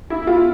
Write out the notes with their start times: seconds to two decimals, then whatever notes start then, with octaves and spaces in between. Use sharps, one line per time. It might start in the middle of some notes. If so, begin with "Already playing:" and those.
0.10 E4
0.27 F4